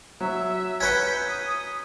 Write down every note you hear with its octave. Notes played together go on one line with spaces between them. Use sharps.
F#3 E5
C#4 B4 F#5 G6 B6
D#6